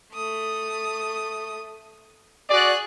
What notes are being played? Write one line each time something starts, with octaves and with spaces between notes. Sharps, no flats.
A3 D#6
F#4 G#4 D5 F#6